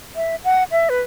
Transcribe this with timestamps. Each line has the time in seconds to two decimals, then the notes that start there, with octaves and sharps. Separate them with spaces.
0.16 E5
0.44 F#5
0.71 E5
0.89 B4